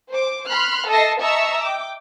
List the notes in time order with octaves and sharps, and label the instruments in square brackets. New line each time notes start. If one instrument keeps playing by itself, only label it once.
[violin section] C5 D6
B5 C6 F6 F#6
A4 D#5 E5 A5 A#6 C7
D#5 E5 A5 A#5 C#6 E6
G5 D6